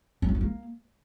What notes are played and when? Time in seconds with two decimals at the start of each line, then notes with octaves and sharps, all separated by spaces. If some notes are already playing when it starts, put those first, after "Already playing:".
0.22 F#3
0.28 C4
0.35 B3
0.41 A#3